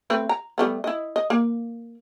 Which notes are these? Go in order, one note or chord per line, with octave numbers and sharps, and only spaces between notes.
A3 C4 B4
A#5
G3 A3 B3
E4 D#5
D#5
A#3